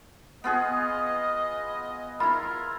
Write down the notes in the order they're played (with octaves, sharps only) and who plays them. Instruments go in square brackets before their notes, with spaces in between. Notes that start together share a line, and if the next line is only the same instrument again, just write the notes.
[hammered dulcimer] B3 F4 G#4 [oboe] D#5
[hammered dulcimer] E4 F4 [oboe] A#4 [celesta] B5